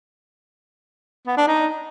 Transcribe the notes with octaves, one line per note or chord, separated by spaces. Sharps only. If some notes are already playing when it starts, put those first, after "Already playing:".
B3
D4
D#4